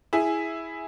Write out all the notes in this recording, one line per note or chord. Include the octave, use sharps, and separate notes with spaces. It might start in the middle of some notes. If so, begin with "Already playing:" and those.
E4 G#4